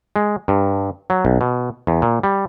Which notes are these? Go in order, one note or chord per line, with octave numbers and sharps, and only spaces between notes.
G#3
G2
F#3
B1
B2
E2
A#2
G3